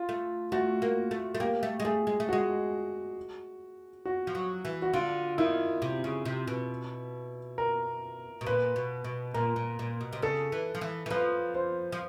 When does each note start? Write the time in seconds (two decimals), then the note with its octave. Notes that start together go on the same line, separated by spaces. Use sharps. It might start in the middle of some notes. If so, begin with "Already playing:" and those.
Already playing: F4
0.09 A3
0.52 A3 F#4
0.82 A#3
1.11 A3
1.35 A3
1.40 A#3 G4
1.63 A3
1.80 G#3
1.85 A3 G#4
2.07 G#3
2.20 A3
2.29 G#3 F#4
4.05 F#4
4.27 F3
4.35 F#3
4.65 E3
4.82 F#4
4.93 D3 F4
5.38 D#3 E4
5.82 C3
6.04 C#3
6.25 C3
6.47 B2
7.58 A#4
8.41 B2
8.46 A#2 B4
8.76 B2
9.04 B2
9.34 A#2 A#4
9.56 A#2
9.79 A#2
10.01 B2
10.13 C3
10.22 C#3 A4
10.52 E3
10.75 F3
10.81 E3
11.06 E3
11.10 F3 B4
11.55 C5
11.92 F3